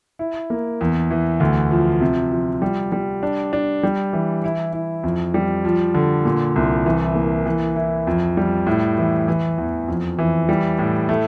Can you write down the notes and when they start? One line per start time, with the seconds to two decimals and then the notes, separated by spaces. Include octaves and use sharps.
0.19 E4
0.50 A#3
0.81 E2
1.11 E3
1.40 D2
1.71 F3
2.01 C3
2.32 F3
2.62 G3
2.92 G3
3.23 D4
3.53 D4
3.83 G3
4.13 E3
4.44 E4
4.73 E4
5.04 F2
5.34 G3
5.65 F3
5.94 D3
6.25 A#2
6.56 C2
6.86 E3
7.15 A#3
7.46 E3
7.76 E4
8.07 F2
8.37 G3
8.67 A2
8.98 E3
9.28 E3
9.58 E2
9.88 F2
10.19 E3
10.49 G3
10.79 A2
11.09 A3